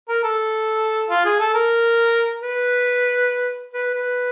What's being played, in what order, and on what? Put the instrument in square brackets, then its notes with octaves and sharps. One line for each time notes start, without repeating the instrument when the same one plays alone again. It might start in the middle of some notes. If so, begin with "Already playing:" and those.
[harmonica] A#4
A4
F4
G#4
A4
A#4
B4
B4
B4